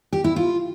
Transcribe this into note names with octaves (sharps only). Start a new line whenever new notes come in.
G4
E4
F4